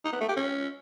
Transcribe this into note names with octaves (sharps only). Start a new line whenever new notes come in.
D#4
B3
A3
G4
C#4